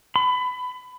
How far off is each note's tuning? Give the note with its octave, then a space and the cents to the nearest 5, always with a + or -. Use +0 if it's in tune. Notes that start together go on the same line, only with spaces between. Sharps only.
B5 +20